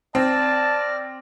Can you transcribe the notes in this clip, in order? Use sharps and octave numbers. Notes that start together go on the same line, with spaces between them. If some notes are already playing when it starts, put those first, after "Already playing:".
C4 D5 A5 F6 A#6